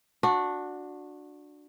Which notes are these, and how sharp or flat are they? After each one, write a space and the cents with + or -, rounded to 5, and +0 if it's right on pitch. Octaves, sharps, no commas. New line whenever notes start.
D4 +5 F#4 -20